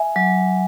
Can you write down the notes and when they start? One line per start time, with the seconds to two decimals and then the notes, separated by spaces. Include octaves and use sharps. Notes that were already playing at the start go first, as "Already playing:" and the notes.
Already playing: E5 G#5
0.16 F#3